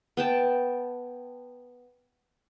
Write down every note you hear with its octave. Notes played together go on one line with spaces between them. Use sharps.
B3 G5 A5